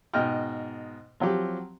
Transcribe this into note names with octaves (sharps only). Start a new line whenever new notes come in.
G#2 B2 D#5 G5 F6
F3 F#3 C4 G4